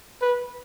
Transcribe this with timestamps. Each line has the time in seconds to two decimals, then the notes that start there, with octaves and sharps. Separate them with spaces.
0.21 B4